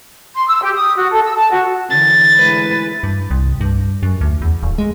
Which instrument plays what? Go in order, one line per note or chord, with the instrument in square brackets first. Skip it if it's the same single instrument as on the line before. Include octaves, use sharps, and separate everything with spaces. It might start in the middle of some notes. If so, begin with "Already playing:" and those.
[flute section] C6
E6
G4
D#6
F#4
A4
E6
A5
F#4
[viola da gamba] D3 E3 [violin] A6
[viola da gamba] G#3 E4 B4
[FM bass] G2
C2
G2
F#2
D2
E2
D1
G#3